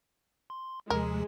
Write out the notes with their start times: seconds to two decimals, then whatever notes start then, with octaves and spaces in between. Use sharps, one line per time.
0.50 C6
0.90 D#2 C3 F3 G#3 A#4